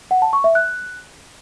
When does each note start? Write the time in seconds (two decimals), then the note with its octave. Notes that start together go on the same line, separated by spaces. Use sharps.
0.11 F#5
0.22 A5
0.33 C#6
0.44 E5
0.55 F#6